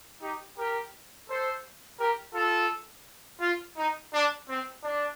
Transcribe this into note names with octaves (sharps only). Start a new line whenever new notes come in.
D#4 G4
G4 A#4
A4 C5
G4 A#4
F4 A4
F4
D#4
D4
C4
D4